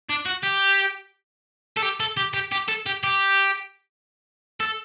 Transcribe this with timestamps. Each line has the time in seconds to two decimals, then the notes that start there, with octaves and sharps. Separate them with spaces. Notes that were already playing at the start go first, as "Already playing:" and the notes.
0.09 D4
0.26 F#4
0.43 G4
1.77 A4
1.83 G4
2.00 A4
2.17 G4
2.34 G4
2.52 G4
2.69 A4
2.86 G4
3.04 G4
4.60 A4